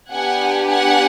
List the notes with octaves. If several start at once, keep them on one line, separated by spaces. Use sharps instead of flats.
B3 D4 G4 F#5 G#5
F#5 G#5